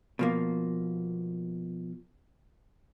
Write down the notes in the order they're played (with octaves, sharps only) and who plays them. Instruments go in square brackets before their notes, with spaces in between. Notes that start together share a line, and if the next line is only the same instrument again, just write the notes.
[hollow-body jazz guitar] B2 F3 A#3